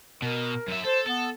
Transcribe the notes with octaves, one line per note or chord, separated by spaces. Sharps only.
B2 A#4
F#2 E5
A4 C5
B3 A4